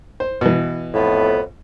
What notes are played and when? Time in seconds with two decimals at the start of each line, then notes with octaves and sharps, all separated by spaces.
0.20 C5
0.41 B2 E3
0.94 F2 A2 B3